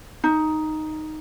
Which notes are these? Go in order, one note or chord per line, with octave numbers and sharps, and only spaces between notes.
D#4